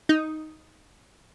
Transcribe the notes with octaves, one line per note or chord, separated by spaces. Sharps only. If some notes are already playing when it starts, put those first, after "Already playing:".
D#4